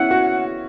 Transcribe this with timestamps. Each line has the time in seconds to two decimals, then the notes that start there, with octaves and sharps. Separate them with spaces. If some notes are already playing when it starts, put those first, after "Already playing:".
Already playing: B3 C#4 E4 F#5
0.11 F#4